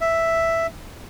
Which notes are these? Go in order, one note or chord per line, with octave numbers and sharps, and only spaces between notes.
E5